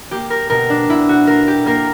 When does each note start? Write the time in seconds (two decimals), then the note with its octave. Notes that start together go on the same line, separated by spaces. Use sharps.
0.11 A#3 G4
0.30 A#4
0.50 B2 A#4
0.70 D4
0.89 B2 E4
1.09 F#4
1.27 A#3 A#4
1.48 G4
1.66 A#3 A#4